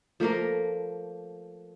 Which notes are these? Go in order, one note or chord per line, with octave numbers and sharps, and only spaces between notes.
F3 A3 A#3 A#4